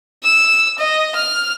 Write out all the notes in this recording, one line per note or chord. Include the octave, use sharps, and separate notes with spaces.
E6
D#5
F6